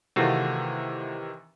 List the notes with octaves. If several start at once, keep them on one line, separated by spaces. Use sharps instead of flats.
C3 D#3 E3 A3 F4 F#4